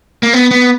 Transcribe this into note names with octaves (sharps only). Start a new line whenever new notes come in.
A#3
B3
B3